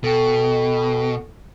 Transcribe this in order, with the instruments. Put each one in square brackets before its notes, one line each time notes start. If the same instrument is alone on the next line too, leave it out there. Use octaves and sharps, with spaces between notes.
[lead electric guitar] B2 [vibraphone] A4 G5